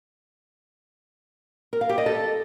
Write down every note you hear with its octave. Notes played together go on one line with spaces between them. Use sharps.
A#4
F5
G4
D#5
A4